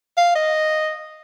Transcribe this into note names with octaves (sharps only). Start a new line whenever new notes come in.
F5
D#5